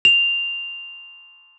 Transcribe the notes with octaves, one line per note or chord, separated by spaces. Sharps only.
F7